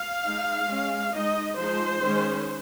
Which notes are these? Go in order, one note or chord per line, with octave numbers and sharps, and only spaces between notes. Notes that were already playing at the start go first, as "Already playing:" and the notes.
Already playing: F5
G#3 D#4
G#3 C#4
G#3 D#4 D#5
F3 G#3 D#4 C5
D#3 G#3 C#4